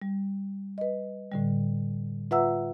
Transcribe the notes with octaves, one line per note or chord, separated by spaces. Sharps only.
G3
B4 D#5
A2 D3 G3
F4 B4 E5 F#5 A#5 E6